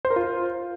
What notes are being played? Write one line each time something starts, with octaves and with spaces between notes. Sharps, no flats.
C5
A#4
F4